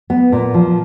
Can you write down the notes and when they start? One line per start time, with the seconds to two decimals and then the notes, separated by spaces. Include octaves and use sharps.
0.10 B3
0.32 A#2
0.54 F3